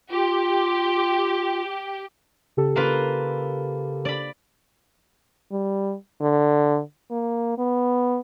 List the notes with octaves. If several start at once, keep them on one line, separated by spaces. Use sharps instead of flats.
F4 G4
C#3 G4 A4
A#3 F4 B4
D5 B5
G3
D3
A#3
B3